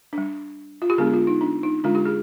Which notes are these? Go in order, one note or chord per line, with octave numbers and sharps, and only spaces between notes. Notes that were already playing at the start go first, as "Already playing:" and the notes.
D4
G3
F4
G4
D3 G#3 B3 D4 G#4
F4
D#4
D4
D#4
D3 G#3 D4 F4
G4
G#4